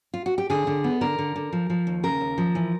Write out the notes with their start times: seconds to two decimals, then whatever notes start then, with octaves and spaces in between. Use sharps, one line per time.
0.14 F4
0.26 F#4
0.38 G4
0.50 D3 G#4
0.67 D3
0.84 B3
1.01 D3 A#4
1.18 D3
1.36 D3
1.53 F3
1.70 F3
1.87 D#2
2.03 C#3 A#4
2.21 D#2
2.38 F3
2.55 E3